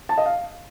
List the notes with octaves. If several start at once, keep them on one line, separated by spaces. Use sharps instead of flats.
A5
D#5
F5